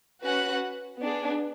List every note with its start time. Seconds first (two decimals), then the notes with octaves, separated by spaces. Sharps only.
0.25 C#4 F#4 B4 F#5
1.01 B3 D4 G#4